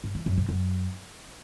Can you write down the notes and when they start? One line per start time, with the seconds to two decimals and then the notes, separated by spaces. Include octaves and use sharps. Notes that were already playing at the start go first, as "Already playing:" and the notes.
0.04 G2
0.15 E3
0.26 F#2
0.37 C3
0.49 F#2